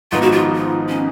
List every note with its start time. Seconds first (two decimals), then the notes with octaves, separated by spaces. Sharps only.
0.12 G#1 G#2 F3 B3 D#4 F4
0.22 F#4
0.32 F4
0.56 F4
0.89 C#4